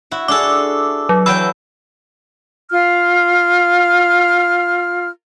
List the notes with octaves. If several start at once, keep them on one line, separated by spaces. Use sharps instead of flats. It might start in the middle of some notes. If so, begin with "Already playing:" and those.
E4 F#4
D4 G#4 A4 D6 E6
F#3
E3 F#3 G5 B5 E6
F4 F6